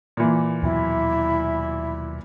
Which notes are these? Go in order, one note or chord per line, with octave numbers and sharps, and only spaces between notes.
A#2 E3
D#2 B2 F#3 E4